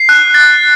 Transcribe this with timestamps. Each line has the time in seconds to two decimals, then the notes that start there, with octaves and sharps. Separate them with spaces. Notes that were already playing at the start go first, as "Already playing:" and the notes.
Already playing: C7
0.09 F#6
0.34 A6